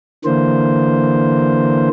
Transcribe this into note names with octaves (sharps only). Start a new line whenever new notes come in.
D3 E3 A#3 C5